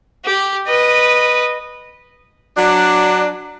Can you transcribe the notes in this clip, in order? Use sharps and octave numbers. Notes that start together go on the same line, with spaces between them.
G4
B4 D#5
F#3 D4